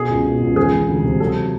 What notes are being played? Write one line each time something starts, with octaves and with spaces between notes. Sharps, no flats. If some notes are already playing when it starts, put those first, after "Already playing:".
Already playing: B2 G#4
C#2
B2
C#2
E1 G#4
E1
D2
C3
F#3 A4